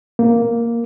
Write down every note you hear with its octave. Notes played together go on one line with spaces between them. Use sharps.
A#3